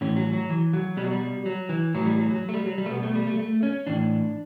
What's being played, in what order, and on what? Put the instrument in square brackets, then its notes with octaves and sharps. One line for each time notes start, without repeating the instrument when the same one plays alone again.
[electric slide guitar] A2 E3 C#4
F#3
F#3
E3
F#3
B2 G3
F#3
G3
F#3
E3
A2 E3 F#3
G3
F#3
F#3
A3
G3
F#3
G3
A3
B2 B3
A3
G3
A3
A3
C#4
A2 E3 D4